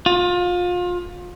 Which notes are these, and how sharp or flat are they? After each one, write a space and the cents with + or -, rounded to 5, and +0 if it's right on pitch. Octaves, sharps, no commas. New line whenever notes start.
F4 +30